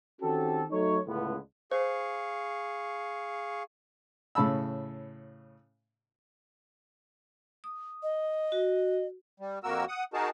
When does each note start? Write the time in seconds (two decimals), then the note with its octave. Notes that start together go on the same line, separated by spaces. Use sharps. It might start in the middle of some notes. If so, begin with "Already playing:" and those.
0.21 D#3 C4 C#4 F#4 G4 A4
0.70 F#3 A3 D#4 A4 C#5
1.07 C#2 A2 D3 B3
1.71 G#4 C5 F5 C#6
4.35 A2 C#3 A5 B5 E6
7.64 D#6
8.03 D#5
8.52 F#4
9.40 G3
9.64 F2 A#3 F#4 A#4 E6
9.88 F#5 D#6
10.14 D#4 F#4 G#4 A#4 A5